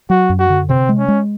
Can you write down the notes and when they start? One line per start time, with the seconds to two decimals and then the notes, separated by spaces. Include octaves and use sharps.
0.10 F#3 F#4
0.30 F#2
0.39 F#4
0.50 D3
0.69 C3 C4
0.89 G#3
0.98 C#4
1.08 G#3